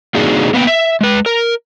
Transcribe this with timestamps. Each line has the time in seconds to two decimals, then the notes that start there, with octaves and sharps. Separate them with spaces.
0.15 A#3 C4 D4 D#4 F#4 G#4
0.54 A#3 B3 F5 G5
0.67 E5
1.01 G#3 B4
1.26 A#4